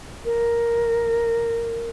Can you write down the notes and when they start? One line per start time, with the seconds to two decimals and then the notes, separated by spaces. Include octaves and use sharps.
0.25 A#4